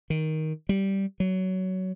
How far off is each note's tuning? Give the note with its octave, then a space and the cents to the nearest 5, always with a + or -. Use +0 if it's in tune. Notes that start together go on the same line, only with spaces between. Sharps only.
D#3 +10
G3 -10
F#3 +15